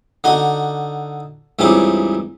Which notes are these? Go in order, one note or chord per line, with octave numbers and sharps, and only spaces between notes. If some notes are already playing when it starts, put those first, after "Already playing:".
D3 D#4 F#4 D#5
C#2 G2 E3 C4 D#4 D6